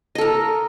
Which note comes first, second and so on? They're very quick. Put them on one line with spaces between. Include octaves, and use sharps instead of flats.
D#5 A4 A#4